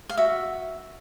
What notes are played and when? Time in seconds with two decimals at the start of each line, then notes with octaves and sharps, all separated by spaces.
0.09 F5
0.17 F#4 E5